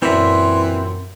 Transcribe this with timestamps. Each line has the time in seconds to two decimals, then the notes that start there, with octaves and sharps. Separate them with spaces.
0.02 F#2 A#2 E3 C4 E5 C6